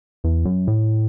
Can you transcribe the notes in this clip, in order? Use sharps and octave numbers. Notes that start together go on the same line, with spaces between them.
E2
F#2
A2